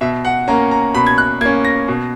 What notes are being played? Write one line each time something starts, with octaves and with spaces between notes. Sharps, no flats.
B2 E5
F#5
A#3 C#4 A#5
A#5
B2 B5
G#6
F#6
A#3 C#4 G#6
A#6
B2